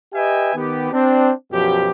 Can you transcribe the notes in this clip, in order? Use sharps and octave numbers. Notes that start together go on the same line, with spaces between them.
G4 B4 D#5 E5 G5 G#5
D#3 B3 G4
C4 D4
F#2 B2 F3 G4